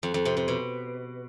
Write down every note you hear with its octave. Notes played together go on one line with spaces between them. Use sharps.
F2
F2
C3
C3
B2